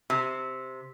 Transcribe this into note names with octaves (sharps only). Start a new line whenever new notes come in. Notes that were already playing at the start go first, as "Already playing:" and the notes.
C3